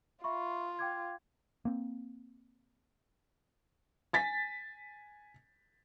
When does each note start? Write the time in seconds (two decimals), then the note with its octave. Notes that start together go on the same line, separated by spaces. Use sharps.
0.24 F4 E5 B5 C#6
0.79 G5 D6 G#6
1.65 A#3 C4
4.13 G#5 A6 B6